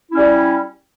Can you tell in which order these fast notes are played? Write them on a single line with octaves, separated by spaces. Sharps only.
E4 C#4 G3